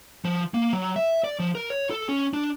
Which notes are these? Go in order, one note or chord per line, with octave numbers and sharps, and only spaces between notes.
F3
A#3
F#3
E5
D5
F3
A#4
C#5
A4
C#4
D4